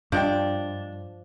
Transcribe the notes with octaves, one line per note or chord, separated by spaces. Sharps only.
G2 F3 D4 C5 D#5 G5